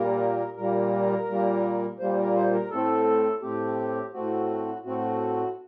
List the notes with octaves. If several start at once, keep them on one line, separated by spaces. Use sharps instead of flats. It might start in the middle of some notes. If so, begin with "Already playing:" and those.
Already playing: A#2 G3 A#3 A#4
A#2 G3 A#3 A#4
A#2 G3 A#3
A#2 G3 A#3 C5
A#4
C5
A#4
A2 A3 C4 A4
A2 A3 C4 G4
A2 A3 C4 F#4
A2 A3 C4 F#4